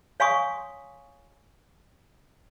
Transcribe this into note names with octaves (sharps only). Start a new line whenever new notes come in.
C#5 F5 G#5 C6 C#6 D#6